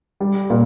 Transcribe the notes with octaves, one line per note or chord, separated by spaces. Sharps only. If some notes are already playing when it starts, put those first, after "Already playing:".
G3
A#2